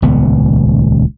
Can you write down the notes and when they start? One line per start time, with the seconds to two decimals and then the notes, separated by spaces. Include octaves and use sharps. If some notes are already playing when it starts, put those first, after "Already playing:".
0.02 D#1 C#2 B3